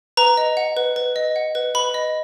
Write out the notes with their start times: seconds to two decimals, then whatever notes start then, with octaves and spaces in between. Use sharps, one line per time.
0.17 B4 A#5
0.37 D#5
0.57 F#5
0.77 B4
0.96 B4
1.16 D#5
1.36 F#5
1.55 B4
1.75 B4 B5
1.94 D#5